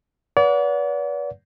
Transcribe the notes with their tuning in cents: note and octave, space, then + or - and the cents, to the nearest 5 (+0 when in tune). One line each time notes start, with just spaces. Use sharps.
B4 -25 D5 -40 F#5 -30